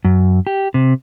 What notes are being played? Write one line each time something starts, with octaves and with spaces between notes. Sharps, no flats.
F#2
G4
C3